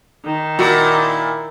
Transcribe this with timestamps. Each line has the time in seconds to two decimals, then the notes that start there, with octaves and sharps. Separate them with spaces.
0.24 D#3
0.59 A#2 E4 F#4 A#4